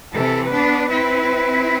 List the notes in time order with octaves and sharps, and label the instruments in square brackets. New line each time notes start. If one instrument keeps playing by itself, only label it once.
[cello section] C3 E3 [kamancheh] A4
[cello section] B3 D4 [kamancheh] B4
[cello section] C4 E4